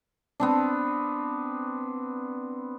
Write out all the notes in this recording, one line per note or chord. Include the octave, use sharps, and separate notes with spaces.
B3 C4 D4